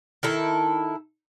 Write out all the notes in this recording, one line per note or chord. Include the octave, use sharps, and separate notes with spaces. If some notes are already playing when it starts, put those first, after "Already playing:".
D#3 E4 A4